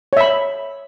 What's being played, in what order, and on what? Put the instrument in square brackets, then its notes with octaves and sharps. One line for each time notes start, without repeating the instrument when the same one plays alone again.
[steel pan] C#5
E5
B5